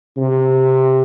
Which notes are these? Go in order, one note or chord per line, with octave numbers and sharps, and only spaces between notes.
C3